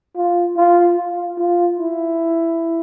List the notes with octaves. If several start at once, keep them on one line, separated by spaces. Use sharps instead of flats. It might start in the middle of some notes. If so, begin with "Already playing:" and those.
F4
F4
F4
F4
E4